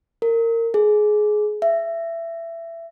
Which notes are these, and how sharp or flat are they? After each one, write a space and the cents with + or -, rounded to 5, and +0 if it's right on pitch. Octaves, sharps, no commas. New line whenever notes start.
A#4 -25
G#4 +20
E5 +20